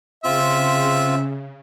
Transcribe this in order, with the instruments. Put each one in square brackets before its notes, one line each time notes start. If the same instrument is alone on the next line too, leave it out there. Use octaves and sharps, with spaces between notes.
[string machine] C#3 [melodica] C4 F4 [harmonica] E5